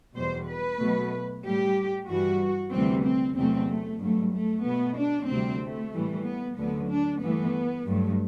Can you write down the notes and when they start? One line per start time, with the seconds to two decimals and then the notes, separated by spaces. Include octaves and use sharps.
0.15 E2 B2 G3 C5
0.48 B4
0.80 B2 F#3 A3
1.44 A2 G3 G4
2.09 G2 E3 G3 F#4
2.72 D2 C3 E3 G3 C4
3.05 C4
3.37 E2 C3 F#3 A3 C4
3.69 A3
4.01 G2 F#3 A3
4.34 A3
4.65 B2 A3 B3
4.98 D4
5.29 D2 C3 G3 C4
5.61 A3
5.94 A2 E3 G3
6.26 B3
6.58 D2 D3 F#3 B3
6.90 D4
7.22 G2 E3 A3 B3
7.87 G2 F#3 A3